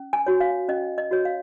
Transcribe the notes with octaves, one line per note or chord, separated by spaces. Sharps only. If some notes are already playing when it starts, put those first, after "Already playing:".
Already playing: C#4
G#5
F#4 C#5
F5
C#4 D#5
D#5
F#4 C#5
F5